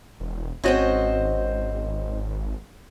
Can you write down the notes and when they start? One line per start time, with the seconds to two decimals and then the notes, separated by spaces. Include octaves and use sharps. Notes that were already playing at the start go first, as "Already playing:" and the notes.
0.20 E1
0.64 G#1 C4 C#4 F#4 C5 D#5